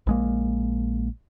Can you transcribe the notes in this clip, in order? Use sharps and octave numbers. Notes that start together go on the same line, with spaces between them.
A#1 G#3 A#3